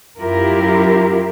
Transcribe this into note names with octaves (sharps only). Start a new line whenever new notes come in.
F#2 E4 F4 G4 A#4